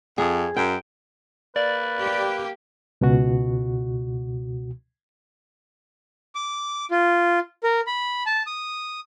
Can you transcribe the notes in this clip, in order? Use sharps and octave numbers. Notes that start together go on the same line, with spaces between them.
F2 G#4
F#2 G5
A#3 B4 D5
G4
C#2 B2 F#4
D6
F4
A#4
B5
A5
D#6